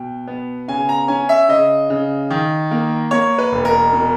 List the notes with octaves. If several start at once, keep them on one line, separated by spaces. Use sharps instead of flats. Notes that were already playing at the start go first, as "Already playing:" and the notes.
Already playing: B2 G5
B3
C#3 G#5
A#5
C#4 G#5
E5
C#3 D#5
C#3
D#3
A#3
A#3 C#5
B4
E1
A#4
B2